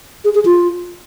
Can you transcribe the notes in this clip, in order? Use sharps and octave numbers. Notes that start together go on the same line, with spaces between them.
G#4
G#4
F4